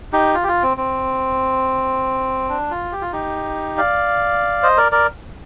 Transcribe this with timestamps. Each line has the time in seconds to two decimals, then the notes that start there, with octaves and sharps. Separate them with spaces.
0.13 D#4 G4
0.34 F4
0.43 G4
0.48 F4
0.62 C4
0.77 C4
2.49 D4
2.71 F4
2.92 G4
3.01 F4
3.12 D#4 G4
3.78 D5 F5
4.63 C5 D#5
4.77 A#4 D5
4.92 A#4 D5